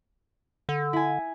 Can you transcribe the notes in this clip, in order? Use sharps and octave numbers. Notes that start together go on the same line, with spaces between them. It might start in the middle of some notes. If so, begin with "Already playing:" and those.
D3
E4 G#5